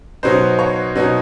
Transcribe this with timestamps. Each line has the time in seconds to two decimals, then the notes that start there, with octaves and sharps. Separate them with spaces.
0.23 B2 F#3 B3 D#4 C5
0.59 C#5
0.95 B2 F#3 B3 D#4